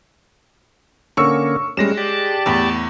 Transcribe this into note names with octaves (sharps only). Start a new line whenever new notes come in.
D3 A#3 C#4 C#6 E6 C#7
G3 G#3 C#4 A#6 E7
G4 D5 A5
E2 A2